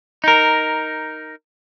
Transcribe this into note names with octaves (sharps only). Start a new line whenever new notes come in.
D#4 A#4